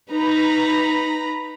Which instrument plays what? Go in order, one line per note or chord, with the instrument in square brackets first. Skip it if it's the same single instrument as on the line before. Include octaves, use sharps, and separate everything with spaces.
[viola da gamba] D#4 [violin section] B4 A#5 B5